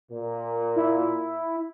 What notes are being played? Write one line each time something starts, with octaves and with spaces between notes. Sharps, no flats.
A#2
E4